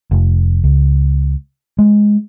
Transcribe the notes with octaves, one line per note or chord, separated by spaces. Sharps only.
F1
C#2
G#3